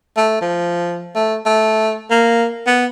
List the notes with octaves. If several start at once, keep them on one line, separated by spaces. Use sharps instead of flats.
A3
F3
A3
A3
A#3
B3